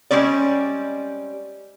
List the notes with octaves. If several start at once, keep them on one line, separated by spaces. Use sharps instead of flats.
G3 G#3 C4 C#4 D5